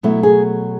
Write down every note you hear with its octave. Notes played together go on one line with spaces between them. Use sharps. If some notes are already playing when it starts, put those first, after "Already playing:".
B2 F#3 A3 E4
G#4